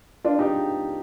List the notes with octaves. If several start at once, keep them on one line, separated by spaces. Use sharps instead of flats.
D4 F4
D#4 G4